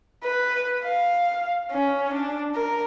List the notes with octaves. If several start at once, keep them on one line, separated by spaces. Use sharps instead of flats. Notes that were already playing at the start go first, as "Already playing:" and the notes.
B4
F5
C#4
D4
A#4